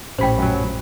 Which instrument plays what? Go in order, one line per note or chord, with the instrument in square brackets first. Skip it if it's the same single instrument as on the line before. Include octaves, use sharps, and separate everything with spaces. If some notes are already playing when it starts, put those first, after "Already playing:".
[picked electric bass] A#1 A2 [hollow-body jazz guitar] C#4 G4 B5 [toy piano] C5 G5
[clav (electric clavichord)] F#2 F#3